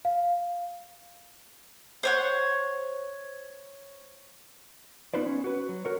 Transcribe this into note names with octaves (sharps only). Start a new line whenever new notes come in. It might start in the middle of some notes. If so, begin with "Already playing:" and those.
F5
C5 C#5 F#5
B3 D#4 F4 B4 C5 D5
C#4
F#4 B4
F#3
F#4 A#4 C#5